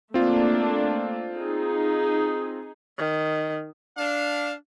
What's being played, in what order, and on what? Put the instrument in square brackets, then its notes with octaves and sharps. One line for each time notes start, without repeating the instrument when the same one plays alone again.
[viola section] A3 A#3 D4 [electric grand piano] C4 F4
[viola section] D#4 G#4
[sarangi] D#3
[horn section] D4 F5